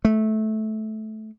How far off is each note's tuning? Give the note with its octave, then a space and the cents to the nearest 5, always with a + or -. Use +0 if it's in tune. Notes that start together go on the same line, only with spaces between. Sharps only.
A3 -15